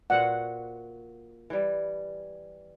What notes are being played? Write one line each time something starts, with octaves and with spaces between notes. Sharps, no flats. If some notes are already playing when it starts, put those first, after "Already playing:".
A#2 F#4 C5 F#5
E3 G3